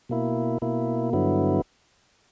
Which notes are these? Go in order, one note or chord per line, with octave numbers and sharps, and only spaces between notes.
B2 A#3 E4
B2 A#3 E4
G2 D3 F#3 B3 E4